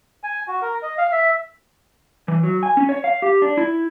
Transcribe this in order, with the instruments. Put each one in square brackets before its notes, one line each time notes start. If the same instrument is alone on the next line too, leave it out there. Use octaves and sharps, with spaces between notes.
[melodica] G#5
F#4
A#4
D#5
F5
E5
[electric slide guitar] E3
F#3
G#5
C#4
C#5
F5
G4
D4
E4